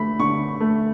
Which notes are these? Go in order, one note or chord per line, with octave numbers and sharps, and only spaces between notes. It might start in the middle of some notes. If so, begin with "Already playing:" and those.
Already playing: D3 A3 B5
D3 C#6
A3